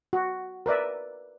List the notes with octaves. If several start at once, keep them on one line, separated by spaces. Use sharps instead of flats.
F#4
A#4 B4 D5 E5